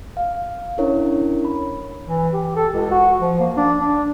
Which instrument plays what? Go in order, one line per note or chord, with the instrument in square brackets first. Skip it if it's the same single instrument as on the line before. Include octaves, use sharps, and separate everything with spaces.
[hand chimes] F5
C#4 D4 E4 A#4 C#5
B5
[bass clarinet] E3
G4
A4
C#2
F#4
F3
A#3
D4
D4